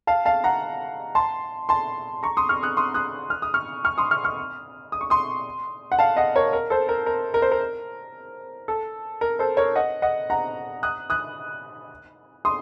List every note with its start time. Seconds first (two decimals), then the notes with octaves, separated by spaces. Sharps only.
0.07 F5 A5
0.25 F5 A5
0.44 F#5 A#5
1.15 A5 C6
1.69 A5 C6
2.23 A#5 C#6
2.37 C6 D#6
2.49 C#6 F6
2.63 D#6 F#6
2.77 C6 D#6
2.94 D#6 F#6
3.30 F6
3.42 D#6
3.54 C#6 F6
3.85 C#6 F6
3.98 C6 D#6
4.11 C#6 F6
4.24 C#6 F6
4.92 D#6
5.01 C#6
5.10 C6 D#6
5.92 F#5
5.99 F5 A5
6.17 D#5 F#5
6.36 A#4 C#5
6.53 A#4
6.70 A4 C5
6.89 A#4
7.06 A#4
7.34 A#4
7.42 C5
7.52 A#4
8.68 A4
9.21 A#4
9.39 A4 C5
9.57 A#4 C#5
9.75 D#5 F#5
10.02 D#5 F#5
10.30 F#5 A#5
10.83 D#6 F#6
11.10 D#6 F#6
12.45 C6 D#6